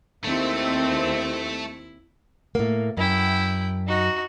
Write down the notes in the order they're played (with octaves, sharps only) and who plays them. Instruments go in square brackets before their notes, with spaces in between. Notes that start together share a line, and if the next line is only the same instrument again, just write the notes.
[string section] D#2 C4 [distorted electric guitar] A3 [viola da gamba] E4
[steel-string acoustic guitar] A2 A#3
[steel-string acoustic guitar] F#2 [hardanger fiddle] E4 G5
[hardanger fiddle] D#4 F#4